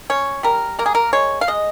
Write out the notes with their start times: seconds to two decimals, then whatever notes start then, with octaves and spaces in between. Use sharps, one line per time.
0.10 C#4 C#5
0.43 G3 A#4
0.79 A#3 A#4
0.86 G#4
0.95 A#4
1.13 G#3 C#5
1.41 F5
1.48 G#3 D#5